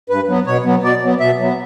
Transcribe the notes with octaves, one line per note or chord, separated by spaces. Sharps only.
G2 B4
F#3 B3
B2 C#5
F#3 B3
B2 D5
F#3 B3
B2 E5
F#3 B3